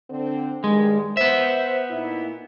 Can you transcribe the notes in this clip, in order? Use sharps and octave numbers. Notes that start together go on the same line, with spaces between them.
D3 C4
G2 D#3 G#3
B3 C5 E5
A#2 D#4 E4